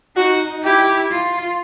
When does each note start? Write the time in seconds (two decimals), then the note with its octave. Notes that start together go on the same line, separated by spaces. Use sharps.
0.17 D#4 F#4
0.63 E4 G4
1.10 F4